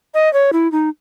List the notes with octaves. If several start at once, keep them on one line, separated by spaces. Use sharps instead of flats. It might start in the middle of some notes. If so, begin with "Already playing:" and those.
D#5
C#5
E4
D#4